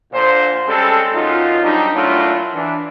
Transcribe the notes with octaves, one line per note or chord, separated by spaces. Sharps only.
A#2 D3 C5
G3 G#3 C4 C#4 A4
F#2 D#4 F4
F#3 G3 C4 D4 D#4
A#2 F#3 A3 D4 E4 F4
E3 D4